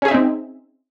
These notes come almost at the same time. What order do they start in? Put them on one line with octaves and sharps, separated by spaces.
C#4 G#4 E5 D#4 C4